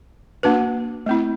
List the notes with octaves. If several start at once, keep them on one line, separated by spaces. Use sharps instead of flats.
A#3 D4 F#4 B4
A3 C4 E4